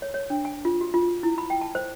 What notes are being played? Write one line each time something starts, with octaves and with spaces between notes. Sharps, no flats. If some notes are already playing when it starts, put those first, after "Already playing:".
C#5
C#5
D4
G#5
F4
F#4
F4
E4
B5
G5
A5
C5